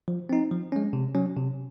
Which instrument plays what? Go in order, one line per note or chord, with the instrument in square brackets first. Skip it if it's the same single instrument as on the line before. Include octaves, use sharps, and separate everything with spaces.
[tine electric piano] F3
C4 D#4
F3
G#3 C#4
C3
F#3 C#4
C3